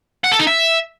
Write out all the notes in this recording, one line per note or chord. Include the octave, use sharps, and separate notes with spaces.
F#5
A4
D#4
E5